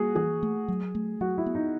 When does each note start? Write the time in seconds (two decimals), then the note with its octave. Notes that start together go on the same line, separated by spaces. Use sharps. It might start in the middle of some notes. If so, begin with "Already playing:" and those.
Already playing: G3 A#3 F#4 G#4
0.16 E3 G#4
0.43 A3
0.68 F#3
0.95 A3
1.21 F#3 F#4
1.38 E4
1.46 B3
1.55 D#4